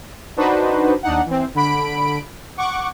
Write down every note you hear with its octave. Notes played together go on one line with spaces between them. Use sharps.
D4 D#4 F#4 B4 C5
D#2 D4 D#4 F#5
E3 C4
D3 B5 D7
F#5 C#6 D6